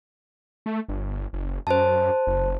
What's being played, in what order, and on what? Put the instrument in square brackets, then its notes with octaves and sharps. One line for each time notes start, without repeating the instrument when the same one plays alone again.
[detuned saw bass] A3
G1
F#1
[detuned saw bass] F#2 [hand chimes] C5 A5
[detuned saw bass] F#1